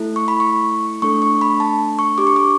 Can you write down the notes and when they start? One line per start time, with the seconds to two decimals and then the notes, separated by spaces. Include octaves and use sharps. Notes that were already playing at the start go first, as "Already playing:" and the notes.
Already playing: A3 E4 A4
0.16 C#6
0.28 B5
0.40 C#6
1.02 A3 D4 A4 C#6
1.22 C#6
1.41 B5
1.60 A5
1.99 C#6
2.18 D4 G4 D6
2.27 C#6
2.36 D6